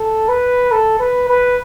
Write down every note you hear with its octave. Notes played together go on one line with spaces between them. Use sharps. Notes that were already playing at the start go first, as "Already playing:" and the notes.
Already playing: A4
B4
A4
B4
B4